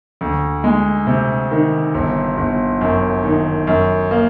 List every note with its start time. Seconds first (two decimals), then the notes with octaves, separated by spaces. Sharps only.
0.21 D2
0.64 G#3
1.07 C3
1.51 D#3
1.94 G1
2.37 G1
2.81 F#2
3.24 D#3
3.67 F#2
4.11 A#3